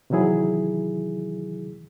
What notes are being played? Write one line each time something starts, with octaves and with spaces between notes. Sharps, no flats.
C3 D#3 E3 F#3 E4 G#4